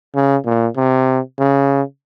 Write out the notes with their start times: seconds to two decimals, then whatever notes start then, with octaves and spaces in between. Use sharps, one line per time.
0.15 C#3
0.45 A#2
0.76 C3
1.38 C#3